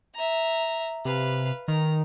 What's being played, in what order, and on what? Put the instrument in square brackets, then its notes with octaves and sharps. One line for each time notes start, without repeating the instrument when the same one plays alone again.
[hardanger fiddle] E5 A#5
[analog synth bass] C3 [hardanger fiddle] B4 F5
[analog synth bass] D#3 [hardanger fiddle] A#5